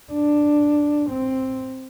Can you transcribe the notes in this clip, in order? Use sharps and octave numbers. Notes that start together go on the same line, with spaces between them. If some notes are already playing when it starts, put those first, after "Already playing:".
D4
C4